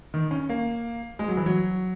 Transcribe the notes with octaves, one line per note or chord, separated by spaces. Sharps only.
D#3
C#4
A#3
G#3
F#3
E3
F#3